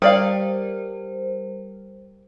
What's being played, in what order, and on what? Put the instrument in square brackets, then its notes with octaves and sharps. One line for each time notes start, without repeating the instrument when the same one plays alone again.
[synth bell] G3 A#4 C5 [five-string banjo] G4 D5 F5